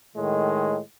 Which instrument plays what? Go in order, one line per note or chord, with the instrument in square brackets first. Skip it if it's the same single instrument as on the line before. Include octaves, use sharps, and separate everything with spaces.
[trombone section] A2 D#3 G#3